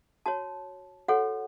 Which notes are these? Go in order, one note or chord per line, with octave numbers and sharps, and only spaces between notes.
F#4 C#5 A5
F#4 A4 C#5 F#5